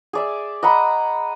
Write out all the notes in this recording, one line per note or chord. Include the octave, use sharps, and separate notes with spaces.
G#4 D5 E5
D#5 F#5 A#5 B5